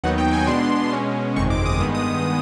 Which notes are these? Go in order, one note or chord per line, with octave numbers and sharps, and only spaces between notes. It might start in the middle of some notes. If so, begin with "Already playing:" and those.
D#2 D#3 F#3 B3 D#4 F#5
G5
G#5
B2 G#3 B3 D4 C6
B2 G#3 C#4
G1 F2 C3 D#3 G#3 C#6
D6
D#6
G2 D#3 G#3 B3 D#6
D#6